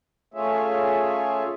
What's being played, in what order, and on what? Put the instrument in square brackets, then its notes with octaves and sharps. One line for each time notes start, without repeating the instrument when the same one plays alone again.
[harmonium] A3 C#4 F4 G#4 C#5 E5